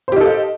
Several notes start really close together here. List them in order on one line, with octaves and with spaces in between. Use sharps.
C5 G4 D#4 A4 F5